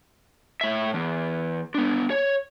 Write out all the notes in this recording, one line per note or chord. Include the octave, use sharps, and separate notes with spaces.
A2 E5
E2
B3 D4
C#5